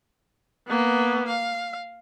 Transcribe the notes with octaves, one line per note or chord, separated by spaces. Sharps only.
A#3 B3
F5